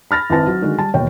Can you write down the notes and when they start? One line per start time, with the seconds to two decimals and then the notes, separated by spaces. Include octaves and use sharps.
0.11 B5 F6 A6 A#6
0.30 G#1 C4 E4 B4 A5 A#6
0.47 F#3
0.62 D3 D#3 G#3 D4 F#4
0.78 G3 A5
0.94 E1 D#2 B2 C#5 G5